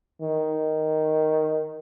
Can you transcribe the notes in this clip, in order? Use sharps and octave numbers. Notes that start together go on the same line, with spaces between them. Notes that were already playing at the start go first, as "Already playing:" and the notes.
D#3